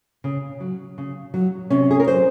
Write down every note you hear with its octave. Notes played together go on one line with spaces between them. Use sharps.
C#3
F#3
C#3
F#3
C3 C#4
G#4
A#4
F#3 C5